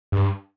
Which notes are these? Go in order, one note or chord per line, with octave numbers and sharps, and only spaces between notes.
G2